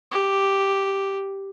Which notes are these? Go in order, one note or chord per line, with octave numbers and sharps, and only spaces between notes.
G4